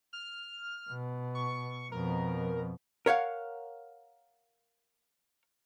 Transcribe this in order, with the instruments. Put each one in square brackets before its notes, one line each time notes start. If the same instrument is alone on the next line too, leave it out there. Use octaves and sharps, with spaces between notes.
[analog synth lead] F6
[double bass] B2
[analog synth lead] C#6
[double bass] F2 B2 [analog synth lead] A#4
[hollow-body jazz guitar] A#4 C#5 F5 F#5